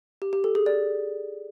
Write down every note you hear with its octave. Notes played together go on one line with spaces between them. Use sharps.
G4
G4
A4
G#4
D5